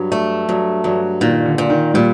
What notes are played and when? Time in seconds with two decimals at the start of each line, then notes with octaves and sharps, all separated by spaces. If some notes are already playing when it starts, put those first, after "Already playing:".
Already playing: G2 F#3
0.12 A3
0.49 G2 F#3
0.84 G2 F#3
1.21 A#2 D#3
1.45 D3
1.58 A#2
1.70 D#3
1.94 A#2 G3